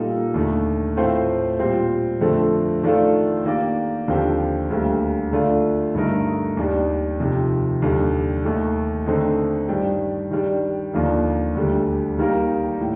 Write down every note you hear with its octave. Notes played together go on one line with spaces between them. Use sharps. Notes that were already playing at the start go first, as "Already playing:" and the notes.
Already playing: A#2 G3 A#3 D#4 A4
D#2 D3 A3
A2 A3 C4 F4 C5
A#2 G3 C4
F2 D3 A3 C4
D#3 A3 D4 F4 A4
D#3 A#3 D4 G4 D5
D#2 D3 F3 C4 G4
D2 D3 G3 A#3
D3 A3 D4 F4
G2 D3 A3 D#4 A#4
D#2 D#3 G3 D4
F2 C3 D#3
D#2 D3 G3
D#2 D#3 A3 D#4
D3 A3 C4 D#4
G2 D#3 G3 D4 G4
D#3 G3 D4
D#2 D3 F3 A#3 D4
D2 D3 G3
D#3 G3 A#3 D#4 A#4
A2